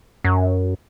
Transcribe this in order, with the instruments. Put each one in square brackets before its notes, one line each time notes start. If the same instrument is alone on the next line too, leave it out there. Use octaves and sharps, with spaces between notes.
[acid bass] F#2